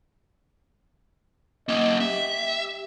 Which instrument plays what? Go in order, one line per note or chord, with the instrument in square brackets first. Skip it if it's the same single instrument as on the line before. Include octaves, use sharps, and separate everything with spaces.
[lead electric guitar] A#3 C#4 [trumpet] D#5
[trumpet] G4 [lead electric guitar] E5